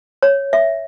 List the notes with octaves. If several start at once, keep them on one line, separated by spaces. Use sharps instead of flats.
C#5
E5